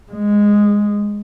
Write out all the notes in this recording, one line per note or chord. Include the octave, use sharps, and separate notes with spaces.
G#3